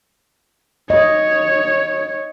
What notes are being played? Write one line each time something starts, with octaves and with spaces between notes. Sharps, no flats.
C#5 D#5